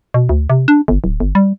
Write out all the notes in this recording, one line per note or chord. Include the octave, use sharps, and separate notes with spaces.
B2
D2
C3
D4
G1
D1
G1
G3